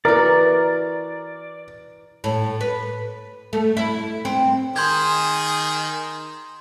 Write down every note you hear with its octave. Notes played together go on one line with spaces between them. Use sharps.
E3 F#4 A#4 D5
A2
B4
A3
E4
C4
D#3 G#4 C6 G6 G#6